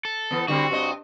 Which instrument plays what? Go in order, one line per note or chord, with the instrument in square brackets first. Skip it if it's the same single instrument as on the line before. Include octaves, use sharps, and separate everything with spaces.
[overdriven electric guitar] A4
[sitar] E3 B3
[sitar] D3 G3 C4 [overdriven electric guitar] F#4
[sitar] G2 C4 D#5